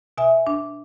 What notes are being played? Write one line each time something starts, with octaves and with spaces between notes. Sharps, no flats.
B2 E5 G#5
D4